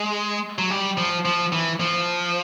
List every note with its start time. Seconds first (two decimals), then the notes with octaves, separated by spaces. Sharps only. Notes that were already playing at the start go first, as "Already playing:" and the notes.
Already playing: G#3
0.59 F#3
0.70 G3
0.97 F3
1.25 F3
1.52 E3
1.80 F3